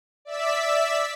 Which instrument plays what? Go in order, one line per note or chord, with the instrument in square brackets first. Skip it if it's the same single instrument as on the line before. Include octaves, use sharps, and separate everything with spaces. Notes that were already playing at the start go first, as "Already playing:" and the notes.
[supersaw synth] D5 E5 E6 B6